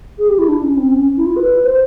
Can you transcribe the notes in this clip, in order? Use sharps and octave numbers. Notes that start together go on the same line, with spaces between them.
G#4
G4
E4
D4
C#4
C4
C#4
E4
F4
B4
C5